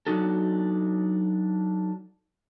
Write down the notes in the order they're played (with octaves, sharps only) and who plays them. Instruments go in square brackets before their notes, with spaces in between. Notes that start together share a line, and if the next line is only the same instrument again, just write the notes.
[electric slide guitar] F#3 D4 D#4 F#4 A4